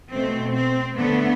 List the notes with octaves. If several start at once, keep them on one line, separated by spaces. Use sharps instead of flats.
B2 A3 C4
C4
D3 A3 B3